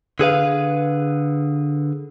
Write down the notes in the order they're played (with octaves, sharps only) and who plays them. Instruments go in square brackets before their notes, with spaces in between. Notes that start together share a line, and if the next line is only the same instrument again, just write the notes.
[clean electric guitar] D3 G#4 B4 F5